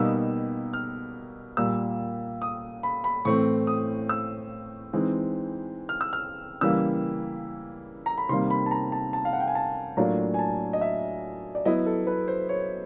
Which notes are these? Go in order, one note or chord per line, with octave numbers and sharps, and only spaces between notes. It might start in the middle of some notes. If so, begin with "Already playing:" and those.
Already playing: B2 G3 A#3 D#4 E6
F6
A#2 G3 A#3 E6
D#6
B5
B5
A2 E3 A3 C4 C#6
D#6
E6
E3 G#3 C4 D#4
F6
E6
F6
C#3 E3 G3 A#3 E6
A#5
B5
C3 D#3 G3 A#3 C6
B5
A5
A#5
A5
A5
F5
F#5
G5
G#5
A5
A2 F#3 A#3 D4 F4 A#5
G#5
A5
D#5
E5
D5
F#3 B3 E4 D#5
A4
B4
C5
C#5